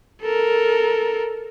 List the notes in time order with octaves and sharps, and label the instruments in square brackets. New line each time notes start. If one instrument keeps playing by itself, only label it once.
[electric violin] A4 A#4